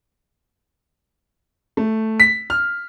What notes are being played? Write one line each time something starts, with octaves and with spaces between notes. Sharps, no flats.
A3
B6
F6